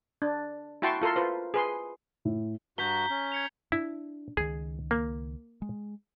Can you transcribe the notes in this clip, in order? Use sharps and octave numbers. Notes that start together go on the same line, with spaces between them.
D4
E4 F#4 G5 A5 C6 C#6
F4 A4 A#4 C6
F4 B4 C5
G#4 B4 C6
A2
G2 F#4 A#5 G6 B6 G7
C#4
G#6 C#7 F7
D4 E4
C#2 D#3 G#4
A#3
G#3